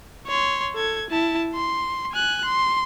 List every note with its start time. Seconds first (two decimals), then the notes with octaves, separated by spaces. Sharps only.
0.27 C#5 C6
0.75 A4 G#6
1.10 E4 A5
1.54 C6
2.12 G#5 F#6
2.45 C6